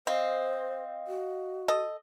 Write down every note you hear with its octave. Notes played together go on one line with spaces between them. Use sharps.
C4 C5 D#5 F5 D#6
F#4
A4 D#5